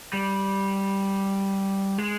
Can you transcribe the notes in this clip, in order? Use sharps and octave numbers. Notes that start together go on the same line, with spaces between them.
G3
G#3